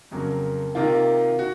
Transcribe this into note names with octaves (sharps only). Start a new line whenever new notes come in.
F2 C#3 F#3 A#3
C3 D#3 A#3 F4
F#4